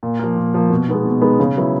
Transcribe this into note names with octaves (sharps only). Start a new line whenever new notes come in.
A#2
F3 A#3
A#2
F3 A#3
B2
G#3 B3 D#4
B2
G#3 B3 D#4
C#3
F#3 B3 E4